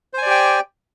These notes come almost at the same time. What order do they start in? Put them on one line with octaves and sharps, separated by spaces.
C5 G#5 D5 G4 G5